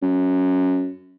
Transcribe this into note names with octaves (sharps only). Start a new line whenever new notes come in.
F#2